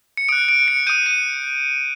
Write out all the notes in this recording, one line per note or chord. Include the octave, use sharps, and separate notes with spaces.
C#7
D#6 F#6 D7
D7
C#7
D#6 G6 D#7
D#7